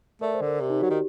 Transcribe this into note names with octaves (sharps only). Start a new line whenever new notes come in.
A3 A#4 D5
C5
D3
A#4
C3 G4
D#4
F#3 F#4
D#3 G4